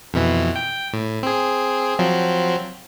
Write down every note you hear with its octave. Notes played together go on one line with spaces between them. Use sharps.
F2 B2 E3
G5
A2
C4 G#4
F3 F#3 C4